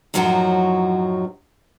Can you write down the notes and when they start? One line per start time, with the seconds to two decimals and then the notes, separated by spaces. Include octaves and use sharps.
0.14 F#2 A2 F3 F#3 D#4 F#4